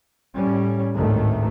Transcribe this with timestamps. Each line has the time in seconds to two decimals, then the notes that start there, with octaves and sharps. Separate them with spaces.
0.35 A2 G3 C#4
0.94 G#1 D2 A2 D#3 A3